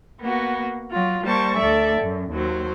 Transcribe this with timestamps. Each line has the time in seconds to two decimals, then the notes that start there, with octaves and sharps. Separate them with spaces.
0.21 A#3 B3 F#4
0.90 F#3 F4
1.25 G3 A#3 C5 A5 C#6
1.57 D2 A4 D5 E5
2.01 F#2
2.31 D#2 F#3 C5